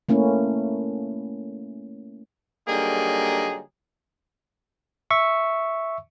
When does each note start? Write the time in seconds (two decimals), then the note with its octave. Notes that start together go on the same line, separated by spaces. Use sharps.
0.09 A3 A#3 C#4 E4
2.67 D3 F#3 G3 A#3 D#4 G#4
5.11 E5 C#6